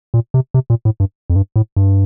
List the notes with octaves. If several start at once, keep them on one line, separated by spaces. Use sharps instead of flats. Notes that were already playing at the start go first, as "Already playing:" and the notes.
A#2
C3
C3
A#2
A2
G2
F2
G2
A2
G2